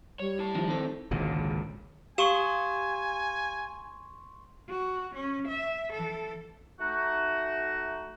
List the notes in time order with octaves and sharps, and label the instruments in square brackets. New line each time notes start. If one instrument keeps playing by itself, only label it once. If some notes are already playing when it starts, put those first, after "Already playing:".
[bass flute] G3 [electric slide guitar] C#5
[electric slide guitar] E4 A5
[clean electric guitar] D#3 F3
D#3 C4 A4
[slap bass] G#1 C#2 A#2 D3
[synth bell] G4 F5 [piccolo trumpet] G#5 [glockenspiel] C6 C#6 E7
[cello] F#4
C#4
E5
E3 A4
[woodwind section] A3 D#4 F#4